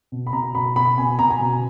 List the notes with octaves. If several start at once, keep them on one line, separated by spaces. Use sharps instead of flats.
B2
B5
B2 A#5
B2 B5
B2 B5
B2 G#5
B2 A#5
G#5
B2